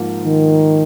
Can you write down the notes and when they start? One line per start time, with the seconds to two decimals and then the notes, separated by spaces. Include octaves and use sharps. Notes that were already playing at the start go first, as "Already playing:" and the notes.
Already playing: G#2 F3 A#3
0.25 D#3